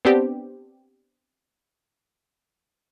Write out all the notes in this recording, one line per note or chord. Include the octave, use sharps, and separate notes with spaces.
B3 C4 D4 G4